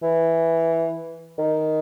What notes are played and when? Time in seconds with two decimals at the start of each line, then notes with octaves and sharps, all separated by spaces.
0.03 E3
1.39 D#3